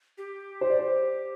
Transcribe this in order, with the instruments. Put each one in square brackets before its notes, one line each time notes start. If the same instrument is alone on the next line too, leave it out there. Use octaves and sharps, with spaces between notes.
[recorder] G4
[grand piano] C5
D5
C5